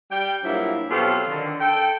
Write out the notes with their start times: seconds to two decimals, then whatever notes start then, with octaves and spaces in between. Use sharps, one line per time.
0.11 G3 G5
0.44 G2 A#2 F3 F#3 A#3 E4
0.90 B2 F#3 C4 F4 G4 A4
1.29 D3 D#3
1.61 A4 G5